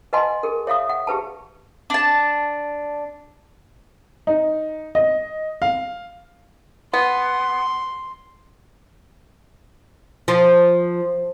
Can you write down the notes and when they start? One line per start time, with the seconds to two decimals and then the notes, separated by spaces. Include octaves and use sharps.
0.13 B4 D#5 F#5 G#5 A5 C6
0.43 G#4 A#4
0.67 C#5 E5 F5 D#6
0.89 F#5
1.07 G4 G#4 B4 A5
1.90 D4 A5
4.27 D#4
4.95 D#5
5.62 F5
6.93 B3 C6
10.28 F3